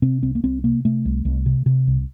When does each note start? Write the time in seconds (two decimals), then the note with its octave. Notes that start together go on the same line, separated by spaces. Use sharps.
0.02 C3 C4
0.22 C2 C4
0.35 A#3
0.44 C2 C4
0.64 C3 A#3
0.85 C3 A3
1.05 C2
1.25 C2
1.46 C3
1.66 C3
1.87 C2